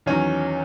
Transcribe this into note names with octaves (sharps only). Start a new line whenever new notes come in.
E2 D#3 F#3 C#4